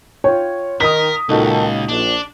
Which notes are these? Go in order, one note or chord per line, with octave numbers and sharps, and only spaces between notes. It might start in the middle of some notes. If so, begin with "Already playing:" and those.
F4 C#5 G5
D#3 A#4 D#6 B6
C#2 A#2 D#3 D#4 F#4 A4
A#1 D4